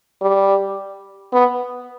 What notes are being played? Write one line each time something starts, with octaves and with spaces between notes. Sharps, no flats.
G3
B3